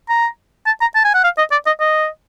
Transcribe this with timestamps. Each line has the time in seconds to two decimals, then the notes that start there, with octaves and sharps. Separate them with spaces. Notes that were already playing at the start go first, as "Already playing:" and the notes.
0.09 A#5
0.66 A5
0.81 A#5
0.95 A5
1.05 G#5
1.14 F#5
1.24 F5
1.38 D#5
1.52 D5
1.67 D#5
1.81 D#5